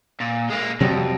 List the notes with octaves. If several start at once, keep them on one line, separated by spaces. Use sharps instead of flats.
A#2
G#3 A#3
F2 C3 F#3 G3